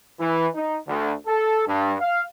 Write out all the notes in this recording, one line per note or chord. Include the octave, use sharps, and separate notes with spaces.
E3
D#4
D2
A4
G2
F5